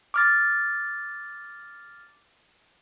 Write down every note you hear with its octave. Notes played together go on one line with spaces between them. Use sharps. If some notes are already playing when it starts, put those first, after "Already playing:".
D6 F6 A6